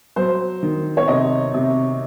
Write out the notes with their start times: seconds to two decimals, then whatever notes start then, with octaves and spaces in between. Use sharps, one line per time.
0.16 F#3 C5
0.63 D#3
0.97 C#5
1.08 C3 D#5
1.54 C3